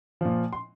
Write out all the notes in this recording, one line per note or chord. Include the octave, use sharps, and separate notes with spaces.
A#2 F3
C6